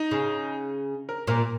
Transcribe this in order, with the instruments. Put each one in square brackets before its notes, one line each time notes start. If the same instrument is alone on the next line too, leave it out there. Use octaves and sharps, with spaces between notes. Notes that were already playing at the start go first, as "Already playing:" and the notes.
Already playing: [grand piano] D#4
[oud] C#3
[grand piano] A#4
[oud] A#2 [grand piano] A#4